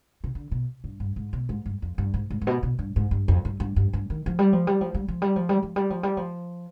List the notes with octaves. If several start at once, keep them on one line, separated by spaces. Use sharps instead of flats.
C3
D3
B2
G2
G2
G#2
B2
G#2
G2
F2
G2
G#2
G#2
G#2
B2
B2
G2
G#2
G2
F2
G2
G2
G2
G2
D#3
F3
G3
F3
G3
F3
G3
F3
G3
F3
G3
F3
G3
F3
G3
F3